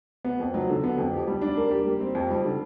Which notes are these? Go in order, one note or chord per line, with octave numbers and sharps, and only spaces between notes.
B3
F2
F#3
D3
B3
F2
G4
G3
D4
A#3
G4
G3
C4
F2
G3
D3